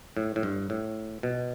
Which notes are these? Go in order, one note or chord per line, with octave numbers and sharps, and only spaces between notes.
A2
A2
G2
A2
B2